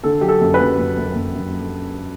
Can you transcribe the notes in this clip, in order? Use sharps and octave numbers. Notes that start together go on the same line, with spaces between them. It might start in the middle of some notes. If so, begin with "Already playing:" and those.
D3 A4
F#3 G4
A4
F#2
B4
F#2
F#2
F#2
F#2
F#2